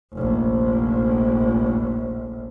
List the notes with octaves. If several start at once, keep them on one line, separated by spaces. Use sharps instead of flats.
F1 A#1